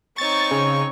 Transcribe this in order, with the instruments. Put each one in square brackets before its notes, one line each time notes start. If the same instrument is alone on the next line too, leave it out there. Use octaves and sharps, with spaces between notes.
[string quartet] C4 D#4 C#5 [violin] C#6 [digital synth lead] A6
[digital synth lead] C#3